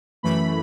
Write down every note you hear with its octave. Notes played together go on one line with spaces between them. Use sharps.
F#2 E3 A3 B5